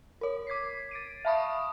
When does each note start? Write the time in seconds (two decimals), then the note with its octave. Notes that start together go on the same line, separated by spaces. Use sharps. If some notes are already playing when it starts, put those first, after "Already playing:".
0.21 A#4 C#5
0.47 D6 G#6 B6 C7
0.91 A6 D7 D#7
1.25 E5 F5 A5 B5 C#6 D#6